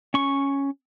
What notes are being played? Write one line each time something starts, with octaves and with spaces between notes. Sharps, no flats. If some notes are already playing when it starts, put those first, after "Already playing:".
C#4 C#6